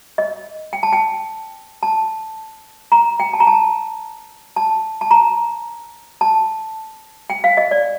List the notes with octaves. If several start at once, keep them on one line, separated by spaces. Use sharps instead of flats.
D#5
G5
A5
G5
A5
A#5
G5
A5
A#5
A5
A5
A5
A#5
A5
G5
F5
D#5
D5